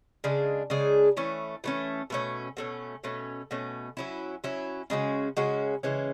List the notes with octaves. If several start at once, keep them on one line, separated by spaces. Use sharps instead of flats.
C#3 G#3 D4 G#4
C#3 G#3 D4 G#4
E3 A3 C#4
E3 A3 C#4
B2 A3 C#4
B2 A3 C#4
B2 A3 C#4
B2 A3 C#4
F#3 C#4 E4
F#3 C#4 E4
C#3 G#3 C#4 F#4
C#3 G#3 C#4 F#4
C#3 E3 G#3 C#4